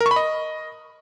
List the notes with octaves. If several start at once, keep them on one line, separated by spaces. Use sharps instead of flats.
A#4
C#6
B5
D#5